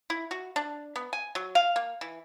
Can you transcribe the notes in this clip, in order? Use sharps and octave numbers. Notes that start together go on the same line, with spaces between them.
E4
F#4
D4
B3
G#5
F#3
F5
A#3
E3